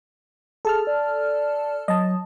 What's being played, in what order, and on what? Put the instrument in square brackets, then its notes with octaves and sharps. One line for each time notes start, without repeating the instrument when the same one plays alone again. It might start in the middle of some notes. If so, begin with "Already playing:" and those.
[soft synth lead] G#4 [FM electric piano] A4 A5 F6
[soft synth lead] D5
[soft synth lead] F#3 [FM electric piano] D#5 A5